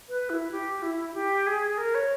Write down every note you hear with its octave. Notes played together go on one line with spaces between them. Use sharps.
B4
E4
G4
E4
G4
G#4
A#4
C#5